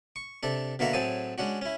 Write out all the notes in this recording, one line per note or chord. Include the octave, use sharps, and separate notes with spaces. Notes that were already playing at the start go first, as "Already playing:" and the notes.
C#6
C3 D4 A4
B2 D3 A#3 F#4 E5 A#5
A2 F#3 C4 G#4 A5 D#6
G#3 C#4 D4 F#4
C#4 E4